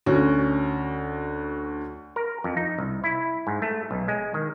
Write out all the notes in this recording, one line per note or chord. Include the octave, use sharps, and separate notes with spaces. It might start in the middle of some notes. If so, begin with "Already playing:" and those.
D2 C#4 F#4
A#4
F2
D#4
C2
E4
G#2
A3
B1
G#3
D#3